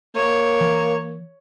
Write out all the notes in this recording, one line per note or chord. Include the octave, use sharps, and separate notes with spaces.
A#3 C#5
E3